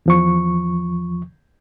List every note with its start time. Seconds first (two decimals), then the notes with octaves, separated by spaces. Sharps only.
0.06 E2 F3 C#6